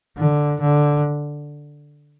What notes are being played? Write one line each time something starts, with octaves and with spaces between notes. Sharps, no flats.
D3
D3